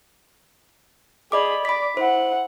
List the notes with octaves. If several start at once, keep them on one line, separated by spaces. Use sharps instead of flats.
G#4 D5 D#5 B5 D6
D5 B5 D6 B6
E4 C5 F#5